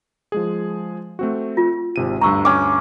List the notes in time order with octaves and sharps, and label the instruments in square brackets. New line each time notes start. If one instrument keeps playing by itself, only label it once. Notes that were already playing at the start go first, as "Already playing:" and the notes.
[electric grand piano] F3 G#3 G#4
A3 C4 F#4
[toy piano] F4
[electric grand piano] G#1 C3 D#7
[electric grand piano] D2 G2 [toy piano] A#5 C#6 E6
[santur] C#4 D6